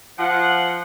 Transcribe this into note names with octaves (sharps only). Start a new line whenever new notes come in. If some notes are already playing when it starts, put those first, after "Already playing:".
F3 F#5